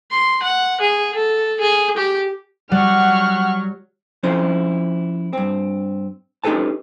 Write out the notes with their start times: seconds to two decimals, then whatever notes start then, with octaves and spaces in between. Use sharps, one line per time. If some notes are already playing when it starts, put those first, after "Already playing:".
0.11 C6
0.42 F#5
0.80 G#4
1.15 A4
1.60 G#4
1.97 G4
2.71 F#3 G3 F#5 C#6 F6
4.23 F3 C4 C#4 E4 C5
5.33 G2 C4
6.44 C#4 D#4 G4 A4 B4 A5